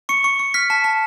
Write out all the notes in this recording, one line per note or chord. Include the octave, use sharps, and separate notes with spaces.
C#6 C#7
C#6
C#6
F6 B6
A5
A5